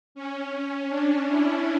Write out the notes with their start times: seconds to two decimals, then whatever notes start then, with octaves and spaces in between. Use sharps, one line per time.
0.15 C#4
0.89 D4
1.27 E4